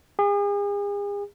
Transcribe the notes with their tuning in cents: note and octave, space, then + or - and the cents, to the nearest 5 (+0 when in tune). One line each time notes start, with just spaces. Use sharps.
G#4 -40